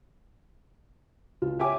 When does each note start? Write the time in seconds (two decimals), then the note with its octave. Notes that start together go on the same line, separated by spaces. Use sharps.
1.42 C#2 F4
1.59 G4 C#5 E5 G#5 D6